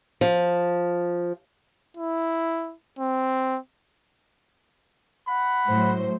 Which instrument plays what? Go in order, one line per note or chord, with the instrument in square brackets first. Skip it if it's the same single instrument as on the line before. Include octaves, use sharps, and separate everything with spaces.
[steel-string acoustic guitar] F3
[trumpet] E4
C4
[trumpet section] F#5 B5
[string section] A2 F#3 C5